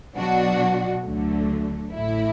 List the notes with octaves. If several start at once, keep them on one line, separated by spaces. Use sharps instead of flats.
B2 F#3 D4 F#4
D2 D3 F#3 A3
A1 A2 A3 E4